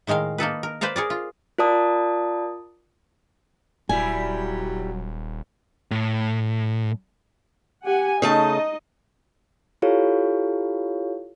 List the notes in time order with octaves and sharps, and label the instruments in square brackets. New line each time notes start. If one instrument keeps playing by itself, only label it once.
[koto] A2 D#3 G#3 A#4 F5
A#3 D#4 A4 B4
A#4
B4 C5 D5 F5 A#5
G#4 A#4 D5
F4
[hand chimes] F4 A#4 D5 A5 D#6
[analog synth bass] D#1 [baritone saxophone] F#3 [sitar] G3 E4 [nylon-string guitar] G#5
[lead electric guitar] A2
[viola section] G4 F#5 G#5
[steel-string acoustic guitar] C#3 A3 A5 [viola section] D#4 D#5
[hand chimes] E4 F4 G4 A4 C#5 F5